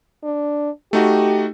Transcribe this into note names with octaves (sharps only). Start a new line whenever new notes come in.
D4
A3 D#4 F#4 G4